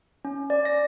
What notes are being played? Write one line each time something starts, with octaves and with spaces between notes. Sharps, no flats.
C#4
D5
A#6